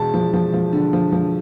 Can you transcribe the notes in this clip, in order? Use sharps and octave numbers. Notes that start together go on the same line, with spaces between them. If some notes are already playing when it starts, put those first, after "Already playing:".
Already playing: E1 A5
F3
F3
F3
D3
F3
F3